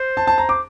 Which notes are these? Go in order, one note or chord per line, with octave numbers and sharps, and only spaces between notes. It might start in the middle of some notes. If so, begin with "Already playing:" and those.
Already playing: C5
A5
A5
A#5
D6